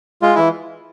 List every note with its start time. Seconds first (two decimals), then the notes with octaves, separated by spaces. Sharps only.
0.22 G#3 F4
0.35 E3 E4